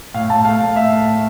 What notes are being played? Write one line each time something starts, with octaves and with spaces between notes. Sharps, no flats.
A2 F5
A2 A5
A3 F5
A2 F5
A3 E5
A3
A2